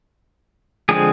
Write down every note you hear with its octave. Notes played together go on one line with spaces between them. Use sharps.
D3 F3 G#3 C4 G#4